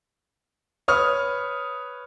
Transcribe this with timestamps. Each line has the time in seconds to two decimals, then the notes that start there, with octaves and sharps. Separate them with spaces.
0.88 B4 C#5 D#6 F6